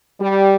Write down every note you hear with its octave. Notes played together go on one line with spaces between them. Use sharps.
G3